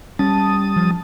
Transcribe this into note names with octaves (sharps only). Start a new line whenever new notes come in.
G3 C#4 A5 D#6
F3